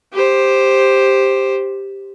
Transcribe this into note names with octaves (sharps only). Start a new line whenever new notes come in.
G4 C5